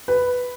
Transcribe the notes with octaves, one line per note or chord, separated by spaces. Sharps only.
B4